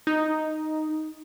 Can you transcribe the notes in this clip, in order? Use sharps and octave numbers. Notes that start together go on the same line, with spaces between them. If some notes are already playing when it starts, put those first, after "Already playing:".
D#4